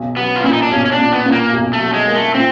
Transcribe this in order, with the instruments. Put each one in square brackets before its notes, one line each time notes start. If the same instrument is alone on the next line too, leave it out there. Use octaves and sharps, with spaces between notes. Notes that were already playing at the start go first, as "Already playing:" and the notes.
Already playing: [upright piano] B1
[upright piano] F#3 [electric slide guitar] B3
[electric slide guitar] F4
[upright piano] A#2 [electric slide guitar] E4
[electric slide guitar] D#4
D4
[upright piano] B1 [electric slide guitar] C#4
[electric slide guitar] C#4
D4
[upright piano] A#2
[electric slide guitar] B3
[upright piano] A#2
[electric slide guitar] A#3
[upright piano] B1
[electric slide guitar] A3
[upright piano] F#3
[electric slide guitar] G#3
[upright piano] A#3
[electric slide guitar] A3
[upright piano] A#2 [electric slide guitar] C4